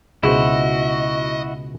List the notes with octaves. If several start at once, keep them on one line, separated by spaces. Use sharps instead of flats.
C#2 B2 E4 F#4 G#4 C5 D#5